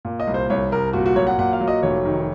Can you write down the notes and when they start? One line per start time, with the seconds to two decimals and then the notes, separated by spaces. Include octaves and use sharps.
0.05 A#2
0.20 D#5
0.27 C2
0.34 C5
0.50 C2 C#5
0.72 C2 A#4
0.93 A#2 F#4
1.06 F#4
1.16 F#3 C#5
1.27 F#5
1.38 A#2 F#5
1.53 F5
1.60 F#3
1.68 D#5
1.83 F1 C#5
2.05 D#3